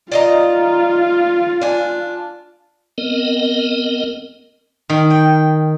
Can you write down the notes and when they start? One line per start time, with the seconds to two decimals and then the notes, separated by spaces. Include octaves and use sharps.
0.12 F4 D5 D#5 A#5
1.61 D4 G#5
2.98 B3 C4 A#4 D#5
4.90 D#3
5.10 G5